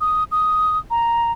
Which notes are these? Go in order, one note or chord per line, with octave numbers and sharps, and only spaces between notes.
D#6
D#6
A#5